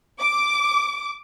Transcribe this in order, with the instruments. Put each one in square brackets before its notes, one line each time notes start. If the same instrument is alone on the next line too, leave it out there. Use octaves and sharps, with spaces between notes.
[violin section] D6